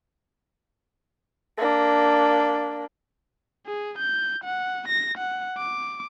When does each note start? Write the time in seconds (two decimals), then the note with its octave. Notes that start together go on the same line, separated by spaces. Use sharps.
1.58 A#3 D4
3.67 G#4
3.98 G6
4.44 F#5
4.88 A#6
5.18 F#5
5.58 D6